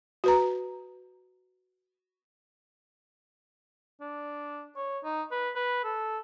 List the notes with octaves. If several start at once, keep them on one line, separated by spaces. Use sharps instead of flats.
F#4 B4 A#5
D4
C#5
D#4
B4
B4
A4